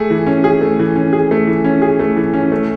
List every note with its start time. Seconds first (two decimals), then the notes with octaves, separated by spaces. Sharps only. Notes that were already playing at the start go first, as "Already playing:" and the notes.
Already playing: A3 G#4
0.10 E3
0.26 C#4
0.44 G#4
0.61 A3
0.79 E3
0.96 C#4
1.13 G#4
1.31 A3
1.47 E3
1.64 C#4
1.82 G#4
1.99 A3
2.17 E3
2.33 C#4
2.52 A3